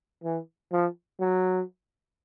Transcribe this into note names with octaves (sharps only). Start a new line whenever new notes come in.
E3
F3
F#3